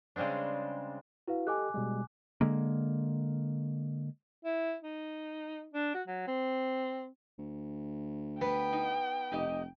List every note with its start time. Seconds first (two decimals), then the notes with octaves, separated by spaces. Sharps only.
0.16 C#3 G3 G#3 C4 D4
1.27 E4 F#4 B4 F5
1.47 G4 A4 D#5 G#5 D6 F#6
1.74 B2 G3 G#3
2.41 D3 G#3 A#3
4.45 E4
4.82 D#4
5.74 D4
5.94 F#4
6.07 F#3
6.27 C4
7.39 D2
8.41 B3 B4 G5
8.73 D#4
9.32 F1 D#4 G4 D#5